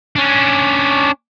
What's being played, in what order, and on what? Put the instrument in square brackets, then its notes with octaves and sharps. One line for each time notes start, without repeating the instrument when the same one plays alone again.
[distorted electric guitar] C#4 D4